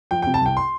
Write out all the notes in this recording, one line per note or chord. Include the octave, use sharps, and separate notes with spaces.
F3 G5
G5
C3
A5
C2 G5
C6